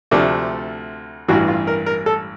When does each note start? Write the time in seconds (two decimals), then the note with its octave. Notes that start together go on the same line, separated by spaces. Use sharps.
0.11 D2 C3 F3 A3 D4
1.28 A1 G2 E3 F#4
1.48 F4
1.67 A#4
1.86 A#4
2.06 A4